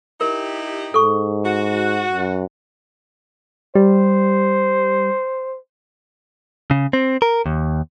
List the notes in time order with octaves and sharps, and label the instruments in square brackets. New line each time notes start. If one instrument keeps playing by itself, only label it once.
[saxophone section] D#4 E4 G4 [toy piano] A#4
[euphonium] G#2 [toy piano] A4 C#6
[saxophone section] F#4
[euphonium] F#2
[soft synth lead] G3 [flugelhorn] C5
[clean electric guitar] C#3
C4
A#4
D#2